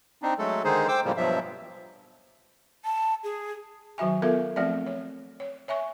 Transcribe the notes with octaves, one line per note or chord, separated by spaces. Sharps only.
C4 D4 D#4
F#3 G#3 A3 A4
D3 D#3 G#3 D#4 G#4 C5
C5 G5 D6 E6
A2 C#3 F3 G3 G#3 A#3
G2 B2 F3 F#3 E5
A5
G#4
D#3 F#3 F#4 E5 G#5
B3 F4 A4 A#4 E5 F5
F3 A3 C4 G#4 D5 E5
C#5
C#5
C#5 E5 G#5 C#6